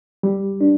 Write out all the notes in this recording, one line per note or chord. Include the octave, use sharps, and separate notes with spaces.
G3
D4